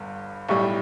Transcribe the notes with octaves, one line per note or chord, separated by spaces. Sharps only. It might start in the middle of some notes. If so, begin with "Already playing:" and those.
Already playing: G1 G2
B1 A2 G3 C#6